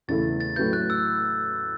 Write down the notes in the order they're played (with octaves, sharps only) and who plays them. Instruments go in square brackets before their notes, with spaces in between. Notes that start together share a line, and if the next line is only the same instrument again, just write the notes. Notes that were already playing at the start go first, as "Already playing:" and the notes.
[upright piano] E2 C#3 E3 A3 E4 [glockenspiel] A6
[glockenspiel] A6
[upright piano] A2 F#3 C#4 E4 B4 [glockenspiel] G6
[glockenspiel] F#6
E6